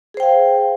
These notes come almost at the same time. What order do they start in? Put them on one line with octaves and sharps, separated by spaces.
G#4 C5 G5 F5